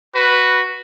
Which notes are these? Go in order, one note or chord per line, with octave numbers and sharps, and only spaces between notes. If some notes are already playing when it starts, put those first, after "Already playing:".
F#4 B4